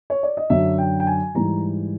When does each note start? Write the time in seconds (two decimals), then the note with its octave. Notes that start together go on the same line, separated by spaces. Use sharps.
0.10 C#5
0.23 D5
0.37 D#5
0.50 F#2 D3 F#3 E5
0.78 G5
1.00 G5
1.07 G#5
1.35 G#2 E3 G3 A#5